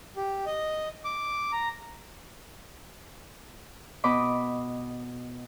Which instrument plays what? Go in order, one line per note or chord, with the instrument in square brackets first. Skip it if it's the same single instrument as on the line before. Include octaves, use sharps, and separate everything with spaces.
[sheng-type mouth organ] G4
D#5
D6
A#5
[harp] B2 D#5 B5 D6